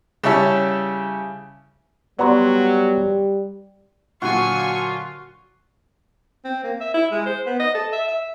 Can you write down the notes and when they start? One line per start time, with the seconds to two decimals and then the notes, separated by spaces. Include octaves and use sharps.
0.24 C#3 G3 E4 C#5 E5 A5
2.19 F#3 G3 B3 F#4 D5 A#5 C6
4.22 A#2 D3 F#3 F4 F#4 G#5 C#6
6.45 C4
6.63 A#3
6.80 E5
6.94 E4
7.12 G#3
7.26 C5
7.46 B3
7.60 D#5
7.75 A4
7.92 E5
8.08 E5